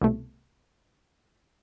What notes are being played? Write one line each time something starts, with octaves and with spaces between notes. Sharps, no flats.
C2 B2 A3